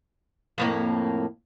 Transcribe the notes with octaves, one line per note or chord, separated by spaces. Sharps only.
F2 A2 A#3